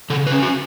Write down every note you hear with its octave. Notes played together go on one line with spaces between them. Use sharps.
C#3 A4
B4
C#4
F#4